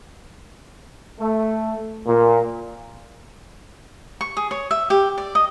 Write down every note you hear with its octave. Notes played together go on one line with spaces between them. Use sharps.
A3
A#2
C#6
G#4
C#5
E5
G4
D5
D#5